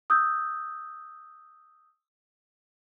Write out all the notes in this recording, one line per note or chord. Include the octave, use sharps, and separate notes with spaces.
D#6 E6 G6